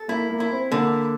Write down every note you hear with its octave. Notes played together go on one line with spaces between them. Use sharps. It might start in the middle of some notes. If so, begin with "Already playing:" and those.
Already playing: A4
A#3 E4
A#3
E4
C4
D3 A#3